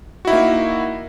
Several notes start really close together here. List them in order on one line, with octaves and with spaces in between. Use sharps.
F#4 E4 D#4 A#3